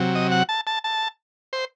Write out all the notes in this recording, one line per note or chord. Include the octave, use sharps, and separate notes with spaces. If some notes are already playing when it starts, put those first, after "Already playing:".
Already playing: C3 F#3
D#5
F#5
A5
A5
A5
C5